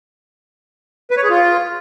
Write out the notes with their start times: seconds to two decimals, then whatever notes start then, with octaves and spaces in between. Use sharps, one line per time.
1.11 B4
1.17 C#5
1.23 G#4
1.30 F4